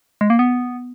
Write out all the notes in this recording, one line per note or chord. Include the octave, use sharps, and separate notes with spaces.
G#3
A#3
B3